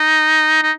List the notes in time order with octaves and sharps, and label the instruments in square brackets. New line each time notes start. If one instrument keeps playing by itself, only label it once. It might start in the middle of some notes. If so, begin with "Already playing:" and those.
Already playing: [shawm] D#4
D#4